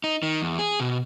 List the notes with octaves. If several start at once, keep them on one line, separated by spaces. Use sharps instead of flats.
D#4
D#3
E2
G#4
B2